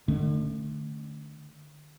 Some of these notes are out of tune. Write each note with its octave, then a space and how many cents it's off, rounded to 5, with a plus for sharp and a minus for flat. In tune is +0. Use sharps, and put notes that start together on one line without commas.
D3 +35 A3 +0 C#4 +0